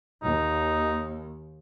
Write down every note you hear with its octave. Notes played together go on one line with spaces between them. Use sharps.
D#2 D#4